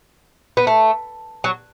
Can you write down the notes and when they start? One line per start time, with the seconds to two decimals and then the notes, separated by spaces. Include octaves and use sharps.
0.57 B3
0.67 A3
1.44 F#3